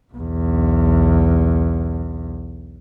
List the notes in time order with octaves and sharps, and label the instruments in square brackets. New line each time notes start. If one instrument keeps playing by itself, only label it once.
[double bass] B1 E2